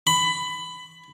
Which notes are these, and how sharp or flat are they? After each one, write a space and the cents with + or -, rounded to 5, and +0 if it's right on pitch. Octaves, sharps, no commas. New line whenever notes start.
B5 +20